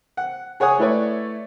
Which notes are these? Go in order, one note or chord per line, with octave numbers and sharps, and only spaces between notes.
F#5
G#4 C#5 F#5 G#5 D#6
A3 E4 B4 C#5 D5